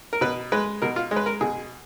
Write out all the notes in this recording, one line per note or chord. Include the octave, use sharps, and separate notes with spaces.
A#4
B2 B4
G#3 B4
B2 A#4
F4
G#3
B4
A#4
B2 G#4